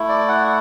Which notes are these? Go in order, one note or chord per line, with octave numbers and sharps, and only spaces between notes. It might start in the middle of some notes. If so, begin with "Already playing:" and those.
Already playing: A3 E4
D5
F#5